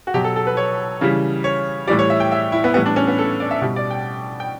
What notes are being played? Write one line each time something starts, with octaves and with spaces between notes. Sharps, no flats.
F#4
B2 F#3 G4
A4
A4
B4
C#5
C#3 E3 G3
C#5
A2 E3 G3 D5
C#5
E5
G5
E5
E4
B3
A2 E3 G3 B3
D4
C#4
B3
A4
D5
E5
B2 G3
D5
G5
G5